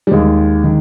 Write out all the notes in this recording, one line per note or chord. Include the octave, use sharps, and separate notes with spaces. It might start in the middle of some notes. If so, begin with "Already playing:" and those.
G3
D#2 D#3 G#3
D#3